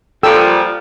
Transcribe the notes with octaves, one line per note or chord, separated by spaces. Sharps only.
A#2 F3 G3 A4 G5 E6